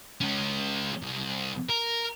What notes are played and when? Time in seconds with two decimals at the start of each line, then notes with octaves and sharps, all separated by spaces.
0.21 G#3 C#4
1.02 C2
1.70 A#4